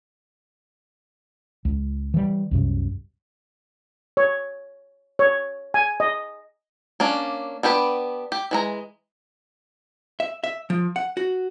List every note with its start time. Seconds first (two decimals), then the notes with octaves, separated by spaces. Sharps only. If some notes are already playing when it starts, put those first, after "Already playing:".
1.65 C#2
2.14 E3 G3
2.51 C2 F#2 C3
4.17 C#5
5.19 C#5
5.74 G#5
6.00 D#5
7.00 A#3 C#4 D4
7.63 B3 D4 G4 B4
8.32 G4
8.51 E3 G#3 A#5
10.20 E5
10.44 E5
10.70 F3
10.96 F#5
11.17 F#4